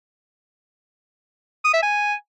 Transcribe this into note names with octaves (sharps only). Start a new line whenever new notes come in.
D#6
E5
G#5